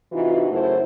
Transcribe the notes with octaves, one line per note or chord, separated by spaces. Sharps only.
C3 E3 D#4 F4 F#4
F#2 C#3 A3 E4 C5